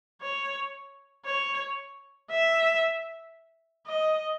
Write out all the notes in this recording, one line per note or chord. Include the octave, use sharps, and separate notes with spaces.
C#5
C#5
E5
D#5